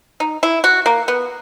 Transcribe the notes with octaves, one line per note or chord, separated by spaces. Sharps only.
D#4
E4
F#4
A#3
B3